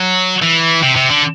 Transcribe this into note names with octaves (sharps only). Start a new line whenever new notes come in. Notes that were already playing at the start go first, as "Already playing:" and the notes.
Already playing: F#3
E3
C3
C3
D3